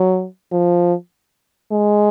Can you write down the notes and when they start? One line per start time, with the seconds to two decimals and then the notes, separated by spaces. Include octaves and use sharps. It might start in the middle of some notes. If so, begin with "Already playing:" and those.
Already playing: F#3
0.52 F3
1.71 G#3